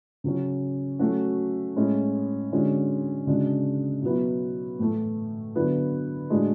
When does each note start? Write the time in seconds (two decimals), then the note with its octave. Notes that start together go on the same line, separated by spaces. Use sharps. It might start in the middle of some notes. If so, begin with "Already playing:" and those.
0.24 C#3 F#3 C#4
0.99 F#3 A3 C#4 F#4
1.76 A2 G#3 C#4 E4
2.51 D3 G#3 C#4 F#4
3.27 C#3 G#3 D4 F#4
4.03 B2 F#3 B3 E4
4.79 A2 E3 A3
5.55 D3 F#3 B3 E4
6.30 A2 G#3 D4 F#4